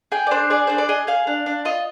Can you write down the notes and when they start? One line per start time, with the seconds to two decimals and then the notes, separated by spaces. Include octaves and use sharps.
0.12 G#4 G5
0.27 D5
0.31 D4 C5
0.50 G#4 D5
0.67 D4 C5
0.78 D5
0.89 G#4 D#5
1.07 G#4 F5
1.27 D4
1.46 D4
1.65 F4 D#5